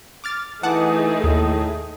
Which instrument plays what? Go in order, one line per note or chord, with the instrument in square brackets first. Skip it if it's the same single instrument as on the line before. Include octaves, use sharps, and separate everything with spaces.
[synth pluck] D6 F6 A6
[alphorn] E3 [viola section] A3 D#4 G#4 [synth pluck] F#5 A5 D6
[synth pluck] D#2 [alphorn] A2